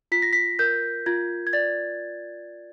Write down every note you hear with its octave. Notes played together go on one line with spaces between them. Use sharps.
F4 B6
A#6
B6
A#4 G6
F4 G#6
G#6
D5 A6